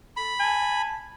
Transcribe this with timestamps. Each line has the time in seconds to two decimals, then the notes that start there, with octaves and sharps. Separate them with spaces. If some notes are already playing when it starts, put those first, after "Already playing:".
0.17 A4 B5
0.39 G#5 A5